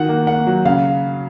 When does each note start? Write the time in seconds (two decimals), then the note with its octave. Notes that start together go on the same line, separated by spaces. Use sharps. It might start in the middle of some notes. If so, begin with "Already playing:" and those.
Already playing: D#3 F#4 F#5
0.09 A#3
0.27 A#3 F#5
0.47 F#3
0.65 C#3 F5